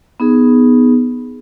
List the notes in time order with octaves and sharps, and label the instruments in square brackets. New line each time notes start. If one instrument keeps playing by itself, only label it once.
[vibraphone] B3 D#4 G#4